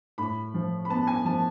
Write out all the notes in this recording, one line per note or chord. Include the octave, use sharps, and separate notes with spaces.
A2 B5
F3
B5
B3 A5
G#5
F3 A5